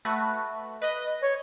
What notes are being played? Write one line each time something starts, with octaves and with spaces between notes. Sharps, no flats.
A3 F#4 B4
B4 D#5
C#5